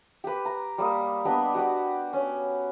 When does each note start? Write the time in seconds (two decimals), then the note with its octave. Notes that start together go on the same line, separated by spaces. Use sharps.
0.24 G4 B4
0.45 A#5
0.78 G3 A#3 D#6
1.25 B3 D4 G4 D#5
1.54 F#4 G4 D6
2.13 C#4